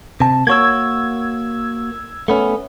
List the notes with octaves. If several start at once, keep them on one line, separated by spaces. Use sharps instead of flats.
C3 A5
A#3 F#4 C#5 E6 G#6
A3 B3 C#4